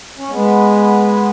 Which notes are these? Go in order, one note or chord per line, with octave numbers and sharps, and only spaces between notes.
C#4
G#3 B3